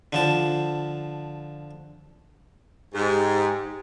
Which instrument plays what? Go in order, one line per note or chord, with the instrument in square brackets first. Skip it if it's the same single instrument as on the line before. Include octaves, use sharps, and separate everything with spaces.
[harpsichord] D3 F3 A5
[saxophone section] G#2 [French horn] G4